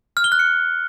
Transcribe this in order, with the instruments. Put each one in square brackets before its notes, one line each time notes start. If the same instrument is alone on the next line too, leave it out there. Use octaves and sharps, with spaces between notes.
[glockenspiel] F6
G7
F#6
C#7